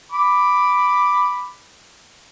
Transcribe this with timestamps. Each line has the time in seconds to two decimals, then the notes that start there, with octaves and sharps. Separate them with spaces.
0.12 B5 D6